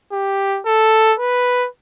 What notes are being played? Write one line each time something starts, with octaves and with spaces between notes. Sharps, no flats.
G4
A4
B4